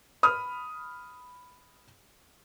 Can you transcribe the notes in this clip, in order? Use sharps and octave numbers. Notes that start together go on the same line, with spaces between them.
B5 D#6 F6